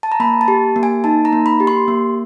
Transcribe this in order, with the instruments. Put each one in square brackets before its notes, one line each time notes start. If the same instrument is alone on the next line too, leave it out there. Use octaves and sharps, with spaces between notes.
[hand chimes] A5
A#5
A#3 B5
A5
G4
A#3
G#5
D#4 A5
A#5
A#3
B5
G4
C6
A#3